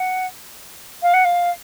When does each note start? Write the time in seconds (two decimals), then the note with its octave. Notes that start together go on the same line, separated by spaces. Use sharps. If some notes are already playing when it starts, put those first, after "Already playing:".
Already playing: F#5
1.02 F5
1.13 F#5
1.24 F5